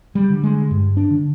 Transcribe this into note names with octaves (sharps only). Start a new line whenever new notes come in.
G3
D3
G#3
G2
D4
D3